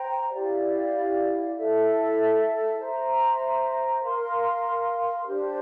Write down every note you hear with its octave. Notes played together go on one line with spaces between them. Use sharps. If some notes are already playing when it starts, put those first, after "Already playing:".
Already playing: C5 G5 A#5
E4 G4 D5 F5
E4 A4 E5
C5 E5 A#5
A#4 F5 C6
D4 G4 C5